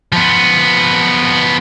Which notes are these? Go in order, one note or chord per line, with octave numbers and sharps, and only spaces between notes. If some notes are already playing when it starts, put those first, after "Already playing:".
F3 B3